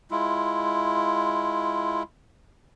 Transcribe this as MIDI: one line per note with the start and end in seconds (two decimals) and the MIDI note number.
0.11 2.03 56
0.11 2.03 64
0.11 2.03 65